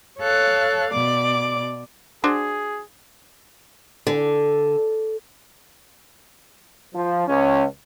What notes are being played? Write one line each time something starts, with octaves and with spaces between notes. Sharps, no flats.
A4 C#5 F5 F#6
B2 D5 D6
D4 F#4 G#4 C5
D3
F3
C#2 C#4